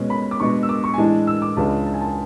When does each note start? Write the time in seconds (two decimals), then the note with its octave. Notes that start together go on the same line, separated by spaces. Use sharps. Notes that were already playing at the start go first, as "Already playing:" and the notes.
Already playing: B2 G#3 C#4
0.10 B5
0.31 D6
0.39 B2 G#3 D4 C#6
0.63 E6
0.69 D6
0.84 C#6
0.94 G#5
0.98 A2 E3 G#3 D4 A5
1.27 E6
1.42 D6
1.57 C#2 C#3 G#3 D4 A5
1.86 A5
1.94 G#5
2.01 A5